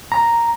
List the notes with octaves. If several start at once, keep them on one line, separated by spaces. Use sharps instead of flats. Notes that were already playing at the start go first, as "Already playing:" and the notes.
A#5